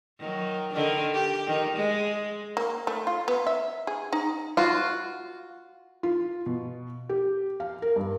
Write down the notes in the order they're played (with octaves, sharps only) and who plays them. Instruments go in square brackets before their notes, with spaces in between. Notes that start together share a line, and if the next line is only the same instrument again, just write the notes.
[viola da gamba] D#3 F#3
D3 D#3 D4
G4
D#3
G#3
[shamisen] A#3
A3
F4
B3
E5
G#4
D#4
[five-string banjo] F4 F#4
[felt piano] F4
B2
G4
F5
A#4
G2